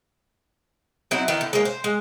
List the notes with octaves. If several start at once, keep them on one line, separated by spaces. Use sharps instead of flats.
F#3 C4 D#4 E4
D#3 E3 D#4 E4
D3
G#3 A#3
C5
G#3